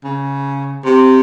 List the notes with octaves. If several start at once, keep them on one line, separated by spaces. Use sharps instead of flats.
C#3
C3